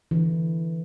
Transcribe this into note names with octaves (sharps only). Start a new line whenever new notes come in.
D3 E3